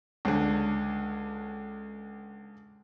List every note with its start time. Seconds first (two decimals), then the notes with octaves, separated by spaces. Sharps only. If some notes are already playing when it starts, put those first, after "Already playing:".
0.25 C#2 D3